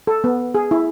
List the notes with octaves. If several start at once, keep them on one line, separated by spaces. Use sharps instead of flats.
A4
B3
G#4
E4